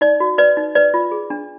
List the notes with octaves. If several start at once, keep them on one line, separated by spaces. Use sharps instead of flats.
D#4 D5
F#4
B4 D5
D#4
B4 D5
F4
G#4
D4